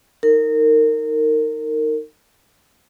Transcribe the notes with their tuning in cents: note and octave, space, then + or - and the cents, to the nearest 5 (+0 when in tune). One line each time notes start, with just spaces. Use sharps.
D#4 +10 A#4 -25